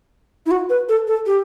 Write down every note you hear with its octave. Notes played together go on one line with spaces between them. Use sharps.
E4
F#4
B4
A4
A4
G4